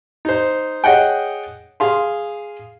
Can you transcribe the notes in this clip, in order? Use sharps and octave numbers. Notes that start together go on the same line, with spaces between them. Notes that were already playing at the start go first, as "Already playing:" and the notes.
D#4 C5
G#4 C#5 D#5 F#5 G5
G#4 F5 C6